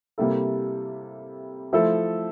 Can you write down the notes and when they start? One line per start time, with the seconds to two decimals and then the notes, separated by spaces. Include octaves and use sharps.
0.18 C3 G3 A#3 E4 A4
1.73 F3 A3 E4 A4